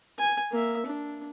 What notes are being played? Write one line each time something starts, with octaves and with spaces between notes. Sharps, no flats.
G#5
A#3 E5
D4